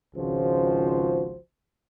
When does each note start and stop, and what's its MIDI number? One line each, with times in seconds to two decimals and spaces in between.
0.15 1.37 32
0.15 1.37 37
0.15 1.37 49
0.15 1.37 53
0.15 1.37 66
0.15 1.37 72